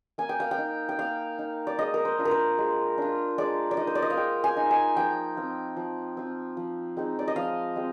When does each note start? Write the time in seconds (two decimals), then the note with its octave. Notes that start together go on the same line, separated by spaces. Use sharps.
0.18 A#3 G#5
0.29 G5
0.40 F5
0.51 G5
0.58 D#4
0.89 G5
0.99 A#3 F5
1.39 D#4
1.67 D5
1.78 G#3 D#5
1.94 A#4
2.05 C5
2.19 D4 F4
2.25 A#4
2.31 C5
2.58 G#3
2.98 D4 F4
3.38 G#3 D5
3.71 D5
3.77 D#4 D#5
3.87 C5
3.95 D5
4.02 D#5
4.10 F5
4.17 G#3 G5
4.44 G#5
4.57 D#4
4.71 G#5
4.97 F3 G5
5.37 C4 F4
5.77 F3
6.17 C4 F4
6.57 F3
6.97 G#3 C4 D#4
7.19 D5
7.28 D#5
7.36 F3 F5
7.76 G#3 C4